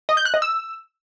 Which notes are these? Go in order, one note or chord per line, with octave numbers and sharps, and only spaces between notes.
D#5
G6
F#6
D#5
E6